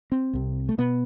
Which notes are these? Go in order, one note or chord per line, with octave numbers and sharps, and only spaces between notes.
C4
C2 C3
A3
B2 B3